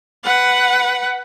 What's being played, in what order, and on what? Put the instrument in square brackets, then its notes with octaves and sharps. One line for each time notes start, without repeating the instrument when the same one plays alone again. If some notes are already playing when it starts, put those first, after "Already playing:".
[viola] B4 F#5